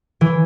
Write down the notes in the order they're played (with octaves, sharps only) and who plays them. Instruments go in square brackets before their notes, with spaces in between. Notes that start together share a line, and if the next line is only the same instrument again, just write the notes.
[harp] E3